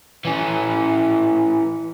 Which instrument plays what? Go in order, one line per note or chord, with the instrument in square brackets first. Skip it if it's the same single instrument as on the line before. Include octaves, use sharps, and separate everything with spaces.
[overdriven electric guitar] E3 C#4